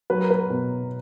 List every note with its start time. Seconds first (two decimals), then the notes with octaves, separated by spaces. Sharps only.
0.10 F#3 B4
0.20 A#4
0.31 B4
0.50 B2